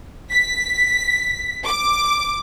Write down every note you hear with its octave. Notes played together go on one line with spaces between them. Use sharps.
B6
D6